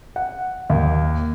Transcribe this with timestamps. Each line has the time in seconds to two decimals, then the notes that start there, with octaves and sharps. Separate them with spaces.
0.16 F#5
0.69 D#2